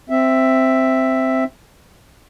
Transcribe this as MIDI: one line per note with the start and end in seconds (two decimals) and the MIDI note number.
0.10 1.44 60
0.10 1.44 76